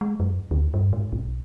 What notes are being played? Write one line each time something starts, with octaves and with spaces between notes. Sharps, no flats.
G#3
F#2
D2
G2
G#2
B1